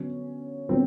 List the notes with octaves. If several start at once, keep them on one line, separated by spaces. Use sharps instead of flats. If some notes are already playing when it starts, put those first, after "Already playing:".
Already playing: D3 F#3 B3 C#4
D3 F#3 B3 C4